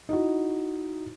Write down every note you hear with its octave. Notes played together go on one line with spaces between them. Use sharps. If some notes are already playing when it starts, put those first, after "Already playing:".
D#4 E4 F#4